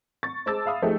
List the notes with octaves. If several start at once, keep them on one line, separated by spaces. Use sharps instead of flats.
C#6 A6
G#3 C5 A5 D6 E6 A6
E5 F5 B5 D#6
F3 A3 D#4 G4 G#4